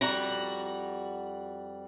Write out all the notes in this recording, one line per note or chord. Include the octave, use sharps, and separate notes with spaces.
F2 G3 F#4 F#5 A#5